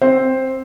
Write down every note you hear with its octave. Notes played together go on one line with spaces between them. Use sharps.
C4 C5